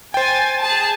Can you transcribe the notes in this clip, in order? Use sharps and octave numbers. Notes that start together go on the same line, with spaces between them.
C5 G5 G#5 A6
G#4 A5